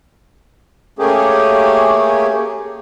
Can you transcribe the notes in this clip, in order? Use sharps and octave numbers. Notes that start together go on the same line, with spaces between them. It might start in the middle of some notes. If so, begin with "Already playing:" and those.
A3 A#3 C#4 G4 G#4